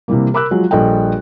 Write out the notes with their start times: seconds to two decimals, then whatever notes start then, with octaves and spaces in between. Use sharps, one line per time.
0.08 C3 E3 G3 A#3
0.34 A#4 B5 D6 E6 F#6
0.51 F3 F#3 G#3
0.71 A#1 G3 A4 D#5 G5